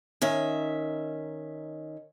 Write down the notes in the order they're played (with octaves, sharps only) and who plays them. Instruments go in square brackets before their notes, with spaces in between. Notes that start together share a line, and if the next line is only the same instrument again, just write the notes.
[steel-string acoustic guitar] D#3 C#4 E5